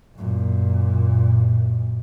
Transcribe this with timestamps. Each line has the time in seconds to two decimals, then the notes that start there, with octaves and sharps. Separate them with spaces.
0.16 F#2 A#2